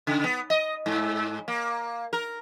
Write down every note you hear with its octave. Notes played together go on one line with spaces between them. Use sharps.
C#3
B3
D#5
G#2
A#3
A#4